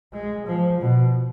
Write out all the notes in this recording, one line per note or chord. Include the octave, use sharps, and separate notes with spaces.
G#3
F3
B2